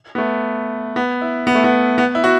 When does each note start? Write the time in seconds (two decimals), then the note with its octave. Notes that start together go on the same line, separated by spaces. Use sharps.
0.15 B3
0.18 A3
0.96 B3
1.22 E4
1.47 B3
1.55 A3
1.64 B3
1.98 B3
2.15 E4
2.24 F#4